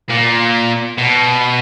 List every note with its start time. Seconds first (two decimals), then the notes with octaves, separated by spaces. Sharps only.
0.09 A#2
0.98 B2